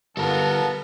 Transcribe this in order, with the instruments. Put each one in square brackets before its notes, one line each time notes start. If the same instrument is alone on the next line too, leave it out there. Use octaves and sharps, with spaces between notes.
[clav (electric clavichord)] G1 [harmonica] B3 [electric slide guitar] A4 A#4 A#5 [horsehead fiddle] F5 A5